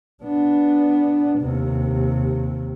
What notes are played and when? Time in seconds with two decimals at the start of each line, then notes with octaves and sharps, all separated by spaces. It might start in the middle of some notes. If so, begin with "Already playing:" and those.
0.23 B3 D4
1.39 D#2 C3